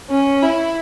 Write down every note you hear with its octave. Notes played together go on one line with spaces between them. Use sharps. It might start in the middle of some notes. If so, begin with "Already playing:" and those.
C#4
E4